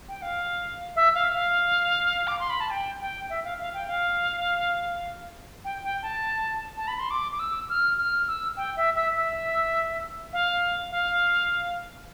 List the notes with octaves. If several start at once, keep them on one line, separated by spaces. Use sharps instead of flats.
G5
F5
E5
F5
F5
D6
C6
B5
A5
G5
G5
E5
F5
F5
G5
F5
G5
G5
A5
A5
B5
C6
D6
D6
E6
F6
F6
E6
G5
E5
E5
E5
F5
F5